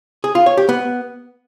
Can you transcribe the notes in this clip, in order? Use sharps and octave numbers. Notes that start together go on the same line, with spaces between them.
G#4
F4
C#5
G4
B3